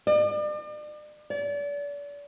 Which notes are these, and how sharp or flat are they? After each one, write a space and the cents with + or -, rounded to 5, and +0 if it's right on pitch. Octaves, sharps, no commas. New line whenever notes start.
D5 +40
D5 -35